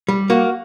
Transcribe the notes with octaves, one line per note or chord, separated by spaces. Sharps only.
G3
A#3 F#4